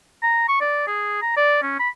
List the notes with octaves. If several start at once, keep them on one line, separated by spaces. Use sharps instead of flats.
A#5
C#6
D5
G#4
A#5
D5
C#4
B5